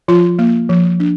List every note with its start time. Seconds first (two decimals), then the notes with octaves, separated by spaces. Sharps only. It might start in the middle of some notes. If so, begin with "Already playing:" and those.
0.08 F3 F4
0.39 A#3
0.69 F3
1.00 D4